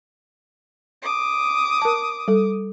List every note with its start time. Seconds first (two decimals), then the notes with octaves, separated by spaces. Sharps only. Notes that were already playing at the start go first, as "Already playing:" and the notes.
1.03 D6 D#6
1.82 A#4 A5
2.28 G3 A4